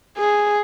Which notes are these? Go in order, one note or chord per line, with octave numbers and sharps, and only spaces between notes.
G#4